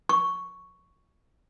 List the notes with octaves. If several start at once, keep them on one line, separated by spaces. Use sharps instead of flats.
C#6